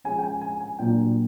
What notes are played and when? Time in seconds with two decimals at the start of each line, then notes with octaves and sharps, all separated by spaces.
0.04 F3 G#3 C#4 G#5
0.18 G5
0.24 G#5
0.41 G#5
0.60 G#5
0.79 A#2 F#3 A#3 D4 G5